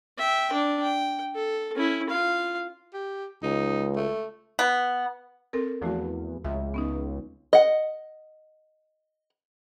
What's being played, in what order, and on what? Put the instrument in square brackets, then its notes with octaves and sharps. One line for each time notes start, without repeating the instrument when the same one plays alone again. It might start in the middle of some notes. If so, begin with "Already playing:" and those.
[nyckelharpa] E5 G5
D4
G5
A4
C#4 E4
F4 F5
[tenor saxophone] G4
[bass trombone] C#2 [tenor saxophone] D#4
[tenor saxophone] A3
[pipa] B3
[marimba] C4 A4 A#4
[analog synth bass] E2 [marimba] F3 A3 F#4
[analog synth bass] C#2 [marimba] E5
[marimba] B3 C#4 D#4
[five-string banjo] D#5 F#5